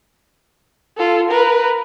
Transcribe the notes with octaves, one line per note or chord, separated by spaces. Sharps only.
F4 A4
A#4 B4